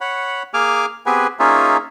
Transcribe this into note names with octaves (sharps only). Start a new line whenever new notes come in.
C#5 F#5 B5
A#3 G#4 G#5 D6 F6
B3 C4 G4 G#4 B4 G#5
A#3 C#4 D#4 F4 G#4 E5